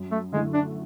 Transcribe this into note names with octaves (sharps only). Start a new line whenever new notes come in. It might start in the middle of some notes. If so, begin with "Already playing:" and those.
Already playing: F#2
A3
D3 G#3 A3 E4
D4